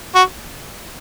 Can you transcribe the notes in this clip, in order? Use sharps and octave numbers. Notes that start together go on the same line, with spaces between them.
F#4